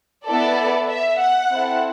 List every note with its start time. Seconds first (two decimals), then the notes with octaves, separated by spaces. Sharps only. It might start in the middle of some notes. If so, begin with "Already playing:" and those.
0.24 B3 E4 A4 D5
0.88 E5
1.19 F#5
1.50 C4 E4 A4